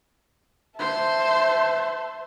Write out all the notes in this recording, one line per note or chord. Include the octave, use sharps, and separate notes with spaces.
C5 E5 A5